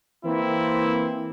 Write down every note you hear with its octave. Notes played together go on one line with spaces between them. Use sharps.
E3 A#3 C4 E4